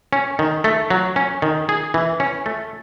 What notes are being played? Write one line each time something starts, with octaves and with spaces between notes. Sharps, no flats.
C#4
D#3
A3
F#3
C#4
D#3
G#4
E3
C#4
A3